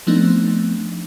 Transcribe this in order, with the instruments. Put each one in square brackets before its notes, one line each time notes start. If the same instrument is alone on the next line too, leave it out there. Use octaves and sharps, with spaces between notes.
[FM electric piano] F3 A3 B3 C4 D4 D#4